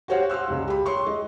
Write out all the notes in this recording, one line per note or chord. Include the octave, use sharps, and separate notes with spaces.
F#4 G4 C5 C#5 F5 F#5
F5 C6 E6 F#6
C#2 G3
G4 B5
C#5 C6 C#6
G#3 D#5